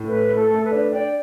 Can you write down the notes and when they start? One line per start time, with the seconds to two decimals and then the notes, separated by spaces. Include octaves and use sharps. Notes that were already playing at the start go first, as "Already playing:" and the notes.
Already playing: A2
0.08 A3 B4
0.29 A3
0.36 A4
0.50 A3
0.64 B4
0.71 D4
0.92 D4 D5 G5